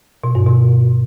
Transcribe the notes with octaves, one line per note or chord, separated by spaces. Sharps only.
B2
G2
B2